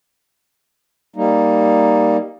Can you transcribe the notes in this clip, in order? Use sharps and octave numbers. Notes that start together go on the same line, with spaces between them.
G3 A#3 D#4